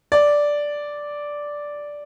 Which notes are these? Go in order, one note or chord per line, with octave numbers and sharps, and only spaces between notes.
D5